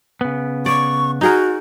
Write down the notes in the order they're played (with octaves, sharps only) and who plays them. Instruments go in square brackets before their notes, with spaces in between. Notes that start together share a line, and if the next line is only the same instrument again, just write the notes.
[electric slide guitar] C#3 B3
[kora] D5 [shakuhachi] C#6
[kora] D#4 G#4 A#4 [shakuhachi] F#4